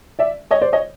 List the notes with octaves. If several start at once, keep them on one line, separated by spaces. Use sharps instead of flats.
D5 E5
C#5 D#5
C5 D5
C#5 D#5